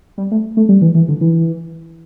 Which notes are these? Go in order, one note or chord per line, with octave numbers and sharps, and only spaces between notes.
G3
A3
A3
G3
E3
E3
D3
E3